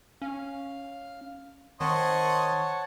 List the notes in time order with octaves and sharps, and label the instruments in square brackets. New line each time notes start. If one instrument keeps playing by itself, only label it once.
[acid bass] C#4 [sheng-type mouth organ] F5
[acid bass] D#3 [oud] C4 [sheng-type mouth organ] C#5 F#5 A5 [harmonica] D#5 C6 C#6